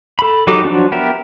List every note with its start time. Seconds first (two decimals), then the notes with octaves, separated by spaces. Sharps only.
0.19 A4 B5
0.47 F#3 D#4 G4 A4 D6
0.64 F3 F#3 D4 F#4
0.92 B3 G4 A#4 E5